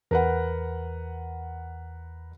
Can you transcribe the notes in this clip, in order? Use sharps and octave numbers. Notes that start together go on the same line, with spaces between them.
E2 A#4 B4 F#5